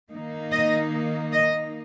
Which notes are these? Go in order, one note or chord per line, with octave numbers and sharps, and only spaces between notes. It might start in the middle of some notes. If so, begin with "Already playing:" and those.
D#3 A#3 D#4
D#5
D#5